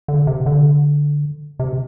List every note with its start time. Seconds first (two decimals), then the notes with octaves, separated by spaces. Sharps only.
0.08 D3
0.27 C3
0.46 D3
1.59 C3